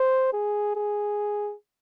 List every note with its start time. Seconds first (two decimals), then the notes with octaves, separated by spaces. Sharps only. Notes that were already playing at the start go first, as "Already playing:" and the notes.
Already playing: C5
0.33 G#4
0.76 G#4